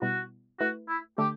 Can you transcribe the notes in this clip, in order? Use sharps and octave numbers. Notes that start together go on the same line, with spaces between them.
B2 G3 B3 E4 F#4
A3 E4 F#4 B4
E4
D3 A3 D4 G4 A4